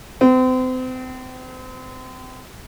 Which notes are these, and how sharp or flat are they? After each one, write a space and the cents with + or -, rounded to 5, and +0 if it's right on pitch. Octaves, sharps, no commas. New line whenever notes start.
C4 -35